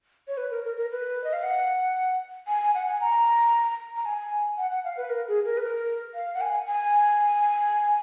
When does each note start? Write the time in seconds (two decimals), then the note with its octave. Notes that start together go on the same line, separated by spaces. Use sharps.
0.28 C#5
0.37 B4
0.51 A#4
0.64 A#4
0.77 A#4
0.91 B4
1.24 D#5
1.33 F5
1.43 F#5
2.47 G#5
2.74 F#5
2.87 G#5
3.01 A#5
3.96 A#5
4.05 G#5
4.58 F#5
4.70 F#5
4.84 F5
4.97 B4
5.10 A#4
5.28 G#4
5.45 A#4
5.57 B4
5.63 A#4
6.14 F5
6.35 F#5
6.41 G#5
6.67 G#5